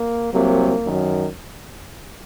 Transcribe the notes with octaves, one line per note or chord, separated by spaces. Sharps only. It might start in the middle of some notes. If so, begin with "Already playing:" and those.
Already playing: A#3
C2 C3 F#3 A#3
F#2 D#3 F#3